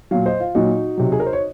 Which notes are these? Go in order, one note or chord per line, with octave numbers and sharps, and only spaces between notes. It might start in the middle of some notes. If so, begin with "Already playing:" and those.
A#2 F#3 C#5 F5
C5 D#5
F4
A#2 F#3 D#4 F#4
C3 F#3
G#4
A#4
C5
C#5